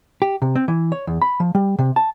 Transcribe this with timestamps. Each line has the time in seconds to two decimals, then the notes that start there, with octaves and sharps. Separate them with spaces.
0.22 G4
0.42 C3
0.56 C4
0.68 E3
0.92 C#5
1.07 E2
1.22 B5
1.40 F3
1.55 G3
1.79 C3
1.96 A5